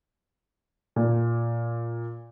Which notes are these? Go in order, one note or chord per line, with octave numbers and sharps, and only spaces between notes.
A#2